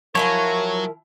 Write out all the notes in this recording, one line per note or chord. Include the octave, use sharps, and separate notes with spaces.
F3 F#3 E4 A#4 C#5 G#5